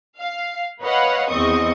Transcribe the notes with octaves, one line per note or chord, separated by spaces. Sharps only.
F5
B4 C#5 D#5 F5 F#5
E2 C4 D#5 C#6 D#6